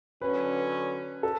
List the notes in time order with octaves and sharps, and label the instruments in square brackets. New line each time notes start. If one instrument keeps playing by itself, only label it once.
[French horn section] D3 F#3 C#4 [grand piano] B4
[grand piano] A4